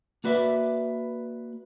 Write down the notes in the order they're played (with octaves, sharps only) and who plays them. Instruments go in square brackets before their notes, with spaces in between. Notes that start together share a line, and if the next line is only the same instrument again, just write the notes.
[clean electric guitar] A#3 F#4 B4 D5 E5